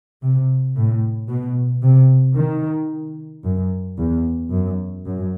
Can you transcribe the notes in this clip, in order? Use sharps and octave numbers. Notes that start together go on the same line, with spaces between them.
C3
A2
B2
C3
D#3
F#2
E2
F#2
F#2